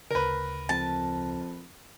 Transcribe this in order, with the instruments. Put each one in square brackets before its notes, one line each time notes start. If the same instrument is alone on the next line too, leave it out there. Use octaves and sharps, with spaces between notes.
[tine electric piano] D2 C#3 [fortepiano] A#4 B4
[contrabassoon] F2 [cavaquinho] A5